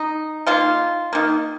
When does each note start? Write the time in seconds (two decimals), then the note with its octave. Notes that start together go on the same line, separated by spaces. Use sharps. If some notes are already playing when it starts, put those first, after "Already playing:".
Already playing: D#4
0.46 D#3 A#3 F4
1.13 D#3 A#3